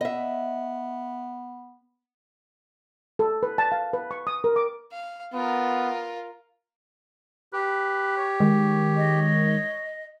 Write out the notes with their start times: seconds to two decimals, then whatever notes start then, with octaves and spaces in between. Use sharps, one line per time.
0.01 B3 D#5 E5
3.19 A4
3.43 B4
3.58 A5
3.72 F5
3.93 B4
4.11 C#6
4.27 D#6
4.44 A#4
4.56 D6
4.92 F5
5.34 B3 F4 A#4
7.53 G4 B4
8.18 C#5
8.40 D#3 G#3
8.96 D#5